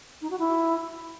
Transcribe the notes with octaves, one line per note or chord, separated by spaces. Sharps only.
D#4
F#4
E4